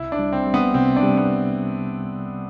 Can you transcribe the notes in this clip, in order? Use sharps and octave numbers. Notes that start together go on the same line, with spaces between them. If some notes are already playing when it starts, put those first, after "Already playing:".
Already playing: C2 E4
D4
G3
C4
G3
B3
C3 C4
D4
G3
B3